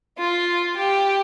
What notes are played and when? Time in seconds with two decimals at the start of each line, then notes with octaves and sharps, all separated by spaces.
0.18 F4
0.77 G4